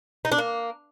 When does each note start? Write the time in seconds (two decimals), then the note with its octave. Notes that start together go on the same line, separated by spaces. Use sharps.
0.25 D#4
0.32 D4
0.38 A#3